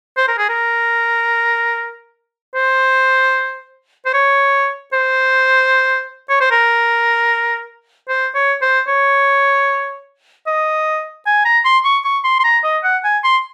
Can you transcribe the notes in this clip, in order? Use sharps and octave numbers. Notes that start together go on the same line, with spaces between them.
C5
A#4
G#4
A#4
C5
C5
C#5
C5
C#5
C5
A#4
C5
C#5
C5
C#5
D#5
G#5
A#5
C6
C#6
C#6
C6
C6
A#5
D#5
F#5
G#5
C6